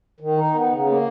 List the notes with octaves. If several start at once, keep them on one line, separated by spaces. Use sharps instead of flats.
D#3
D#4
B3
C#3
A#3